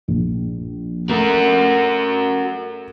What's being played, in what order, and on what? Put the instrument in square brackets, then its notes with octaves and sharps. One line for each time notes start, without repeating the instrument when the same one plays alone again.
[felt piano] A#1
[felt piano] A3 [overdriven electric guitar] F#4 A#4